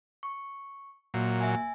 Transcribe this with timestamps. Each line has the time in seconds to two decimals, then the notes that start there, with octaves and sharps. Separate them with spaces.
0.23 C#6
1.14 A#2 F#3 A#3
1.40 E5 G#5